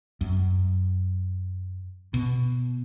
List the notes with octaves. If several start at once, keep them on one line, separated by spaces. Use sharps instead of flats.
F#2
B2